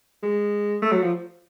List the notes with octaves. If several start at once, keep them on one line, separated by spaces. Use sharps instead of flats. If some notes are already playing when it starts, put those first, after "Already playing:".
G#3
A3
F#3
F3